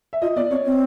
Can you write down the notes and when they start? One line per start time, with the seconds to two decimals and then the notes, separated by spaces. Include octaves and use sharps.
0.13 E5
0.22 F4 D#5
0.36 B3 D5
0.50 C4 C#5
0.65 C4